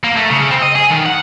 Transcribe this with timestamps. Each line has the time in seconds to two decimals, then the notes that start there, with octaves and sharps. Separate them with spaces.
0.04 A#3
0.17 A3
0.31 C#3
0.51 C4
0.62 D#5
0.75 G#4
0.91 D#3
1.06 F#5